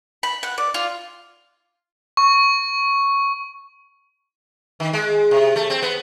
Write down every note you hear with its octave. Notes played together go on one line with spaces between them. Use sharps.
B5
F#5
D5
F4
C#6
D#3
G#3
C3
A3
C4
B3